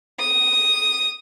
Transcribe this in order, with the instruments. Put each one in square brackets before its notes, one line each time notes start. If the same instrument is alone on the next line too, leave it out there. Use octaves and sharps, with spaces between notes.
[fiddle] D#6